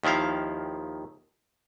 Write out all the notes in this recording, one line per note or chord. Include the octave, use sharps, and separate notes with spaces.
D#2 D#3 F3 E4 F5